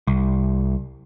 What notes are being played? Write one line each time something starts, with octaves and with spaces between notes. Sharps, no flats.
C2